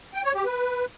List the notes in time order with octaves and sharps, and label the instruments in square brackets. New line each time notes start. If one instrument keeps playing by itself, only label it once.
[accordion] G5
C#5
G4
B4